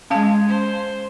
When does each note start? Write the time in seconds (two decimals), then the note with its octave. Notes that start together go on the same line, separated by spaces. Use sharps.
0.10 G#3 C#4 F5 A5
0.48 C5